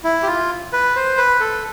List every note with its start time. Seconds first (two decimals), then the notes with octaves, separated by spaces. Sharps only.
0.04 E4
0.23 G4
0.27 F4
0.73 B4
0.96 C5
1.17 B4
1.40 A4